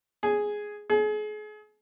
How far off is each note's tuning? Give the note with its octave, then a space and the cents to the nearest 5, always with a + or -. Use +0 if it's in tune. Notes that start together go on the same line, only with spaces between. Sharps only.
G#4 +0
G#4 +35